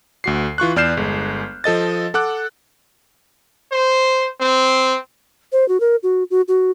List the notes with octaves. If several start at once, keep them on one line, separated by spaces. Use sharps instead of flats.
D2 F#4 C7
E3 F4 C#6 F#6
E2 D5 F6 G6 C7 E7
G1 G#3
F3 A4 D#5 A6
A4 F#5 D6 F#6
C5
C4
C5
F#4
A#4
F#4
F#4
F#4